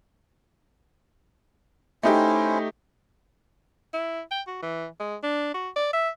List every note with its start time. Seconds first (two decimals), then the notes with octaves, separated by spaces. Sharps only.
2.03 A3 C#4 D#4 E4 G4 C5
3.94 E4
4.31 G5
4.48 F#4
4.63 E3
5.00 G#3
5.23 D4
5.54 F#4
5.76 D5
5.93 E5